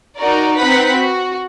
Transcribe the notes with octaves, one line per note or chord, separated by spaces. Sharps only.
D#4 F#4 A#4 D5
C4 D#4 B4 F#5 B5 B6
F#4